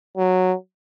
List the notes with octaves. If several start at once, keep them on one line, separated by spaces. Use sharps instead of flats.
F#3